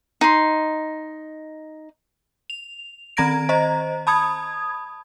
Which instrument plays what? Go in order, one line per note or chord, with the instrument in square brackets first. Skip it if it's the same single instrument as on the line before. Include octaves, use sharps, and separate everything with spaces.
[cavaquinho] D#4 C6
[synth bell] F7
D#3 C4 A#5 G#6 A#6 D7
C5 D#5 A#5
A5 B5 D#6 G#6